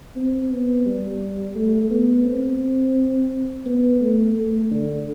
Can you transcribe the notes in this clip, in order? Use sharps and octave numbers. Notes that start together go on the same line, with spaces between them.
C4
B3
G3
A3
B3
C4
B3
A3
A3
D3